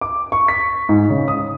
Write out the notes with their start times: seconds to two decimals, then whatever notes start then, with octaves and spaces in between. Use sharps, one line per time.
0.01 D6
0.32 C#6
0.48 B6
0.89 G#2
1.10 C#3
1.28 D#6